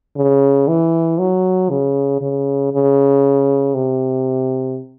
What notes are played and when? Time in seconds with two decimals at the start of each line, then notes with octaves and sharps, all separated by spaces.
0.16 C#3
0.68 E3
1.19 F#3
1.70 C#3
2.21 C#3
2.72 C#3
3.74 C3